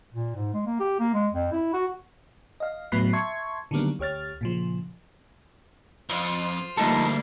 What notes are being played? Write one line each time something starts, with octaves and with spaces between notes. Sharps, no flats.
A#2
G#2
G#3
A#3
G4
A#3
G#3
F2
E4
F#4
D#5 F5
A2 F#3 B3 B5 F#6 C7
E5 A5 C6 C#6 G#6
D3 D#3 F#3 G3 A#3 B3
D2 G4 C#5 F6 A6
A#2 C#3 F3
F2 F4 C5
D2 F3 G3 A#3 D#4 A4